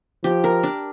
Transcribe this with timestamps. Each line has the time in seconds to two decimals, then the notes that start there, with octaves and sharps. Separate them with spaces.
0.24 F3 G4
0.44 A#4
0.63 D4